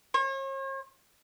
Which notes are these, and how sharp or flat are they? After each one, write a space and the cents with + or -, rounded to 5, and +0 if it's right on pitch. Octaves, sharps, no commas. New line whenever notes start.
C#5 -45